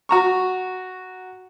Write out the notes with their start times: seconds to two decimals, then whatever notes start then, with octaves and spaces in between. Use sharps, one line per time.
0.09 F#4 A#5 C#6